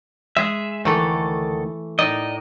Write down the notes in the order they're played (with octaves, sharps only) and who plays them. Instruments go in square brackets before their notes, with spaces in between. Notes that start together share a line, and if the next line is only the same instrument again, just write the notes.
[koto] G#3 G#4 [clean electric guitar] E5
[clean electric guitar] D2 D#3 A4 [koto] E3 A3
[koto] A2 D#4 [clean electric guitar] D5 D#5